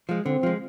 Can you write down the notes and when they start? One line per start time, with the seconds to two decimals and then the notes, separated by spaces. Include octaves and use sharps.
0.09 F3 G#3
0.26 D3 C4
0.43 F3 G#3